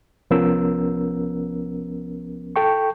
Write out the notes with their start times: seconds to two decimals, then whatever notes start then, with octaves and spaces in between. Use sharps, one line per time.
0.31 C2 F3 B3 C#4 A#4 E6
2.56 A4 G5 C#6